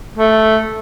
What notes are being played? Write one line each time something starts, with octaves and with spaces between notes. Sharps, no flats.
A3